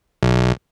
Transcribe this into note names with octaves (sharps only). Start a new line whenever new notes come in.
B1